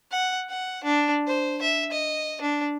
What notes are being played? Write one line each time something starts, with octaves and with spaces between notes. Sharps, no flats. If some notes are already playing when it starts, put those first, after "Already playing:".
F#5
F#5
D4
C5
E5
D#5
D4